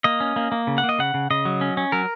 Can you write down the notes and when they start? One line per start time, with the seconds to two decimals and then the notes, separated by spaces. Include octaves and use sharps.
0.04 A#3 D#5
0.20 C#4
0.36 A#3
0.52 A#3
0.67 C#3
0.78 F#5
0.84 A#3
0.89 D#5
0.99 C#3 F#5
1.14 C#3
1.30 C#3 D#5
1.45 F#3
1.61 C#4
1.77 C#4
1.92 F#3 A#4